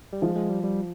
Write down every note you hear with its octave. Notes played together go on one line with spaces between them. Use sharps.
G3
F3 G#3
G#3
G3
G3